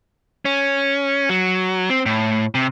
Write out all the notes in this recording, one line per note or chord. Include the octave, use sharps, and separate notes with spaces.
C#4
F#3
C4
A2
C3